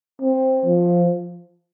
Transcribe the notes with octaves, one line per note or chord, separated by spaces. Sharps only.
C4
F3